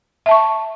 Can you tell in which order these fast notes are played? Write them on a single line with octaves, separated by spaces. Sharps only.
E5 A5 C#6